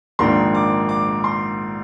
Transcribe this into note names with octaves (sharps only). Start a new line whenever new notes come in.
A#1 G#2 D#3 A#3 D4 C6
D6
D6
C6